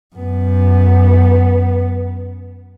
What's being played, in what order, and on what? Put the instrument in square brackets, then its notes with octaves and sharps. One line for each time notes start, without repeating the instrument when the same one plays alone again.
[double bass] F#2 B3